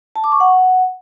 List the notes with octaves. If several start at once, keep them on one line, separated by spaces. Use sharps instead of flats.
A5
D6
C#6
F#5